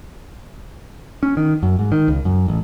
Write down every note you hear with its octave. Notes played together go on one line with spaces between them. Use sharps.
C#4
D#3
F#2
G#2
D#3
C#2
F#2
A1